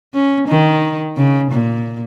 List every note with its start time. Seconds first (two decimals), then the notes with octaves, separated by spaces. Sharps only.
0.14 C#4
0.48 D#3
1.17 C#3
1.51 A#2